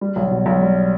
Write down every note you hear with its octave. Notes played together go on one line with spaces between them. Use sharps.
G3
B1
B2
B1
G3